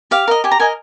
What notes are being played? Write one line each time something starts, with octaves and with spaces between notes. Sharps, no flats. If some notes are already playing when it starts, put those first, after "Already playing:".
G4 F5
A#4 D#5
G4 G#5
A#5
A#4 D#5 G#5